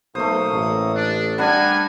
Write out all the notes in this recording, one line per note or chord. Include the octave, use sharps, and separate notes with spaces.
B1 A3 A#3 C5 D#6
A1
D4
G3 B3 D4 A#4 F#5 G#5